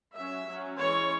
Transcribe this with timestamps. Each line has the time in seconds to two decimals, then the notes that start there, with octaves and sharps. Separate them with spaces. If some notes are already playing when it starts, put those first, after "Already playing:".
0.15 F#3 C#4 E5
0.47 F#3 C#4
0.78 E3 G#3 C#4 C#5